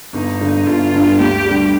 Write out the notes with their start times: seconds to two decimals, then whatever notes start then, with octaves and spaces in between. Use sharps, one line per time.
0.13 G1 D#4
0.41 G2 D3
0.66 G1 F4
0.93 G2 D3
1.20 D2 G4
1.46 D3 G3